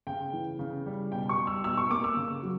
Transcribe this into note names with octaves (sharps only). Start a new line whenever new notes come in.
C#3 G5
E3
C#3
G3
B2 G5
C#6
G3
E6
B2 E6
C#6
A#3 D6
E6
C#3
F#3